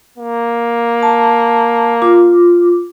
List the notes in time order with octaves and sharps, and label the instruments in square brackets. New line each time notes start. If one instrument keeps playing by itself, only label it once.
[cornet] A#3
[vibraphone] A5
F4 D6